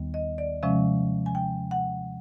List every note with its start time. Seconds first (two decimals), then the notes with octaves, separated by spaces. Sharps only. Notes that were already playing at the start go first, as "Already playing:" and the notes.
Already playing: D#2 D#3 G3 B3
0.14 D#5
0.38 D5
0.63 C3 F3 G#3 C#4 E5
1.26 G#5
1.35 G5
1.71 F#5